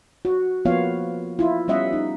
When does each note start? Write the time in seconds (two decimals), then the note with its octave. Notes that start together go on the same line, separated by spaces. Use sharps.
0.25 F#4
0.65 F3 A#3 B3 F4 C#5 F5
1.39 E4 F4
1.68 G3 B3 C#4 D#5 E5 F#5
1.93 D#4